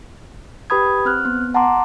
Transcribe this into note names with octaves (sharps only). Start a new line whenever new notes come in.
G4 B4 B5 D#6 G#6
C4 F6 F#6
B3
F#5 A5 A#5 C6 D6